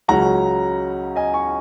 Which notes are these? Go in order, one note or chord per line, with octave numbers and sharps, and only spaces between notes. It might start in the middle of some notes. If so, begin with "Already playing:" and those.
C#2 C#3 F#3 C#4 F#5 A#5
D#5 G#5
G#5 C#6